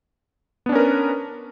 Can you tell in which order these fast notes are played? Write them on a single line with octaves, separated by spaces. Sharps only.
B3 D4 C#4 A#4 B4